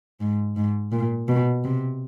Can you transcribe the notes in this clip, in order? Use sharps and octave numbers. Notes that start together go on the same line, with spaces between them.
G#2
G#2
A#2
B2
C3